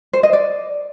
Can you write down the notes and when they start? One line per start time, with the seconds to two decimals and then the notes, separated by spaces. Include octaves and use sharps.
0.13 C5
0.23 D#5
0.33 D5